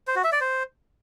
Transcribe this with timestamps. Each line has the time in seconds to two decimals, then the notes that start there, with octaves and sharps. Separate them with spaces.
0.07 C5
0.16 F#4
0.24 E5
0.32 D5
0.41 C5